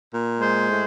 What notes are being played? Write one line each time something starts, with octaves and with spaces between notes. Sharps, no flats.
A#2
G#3 C5
A2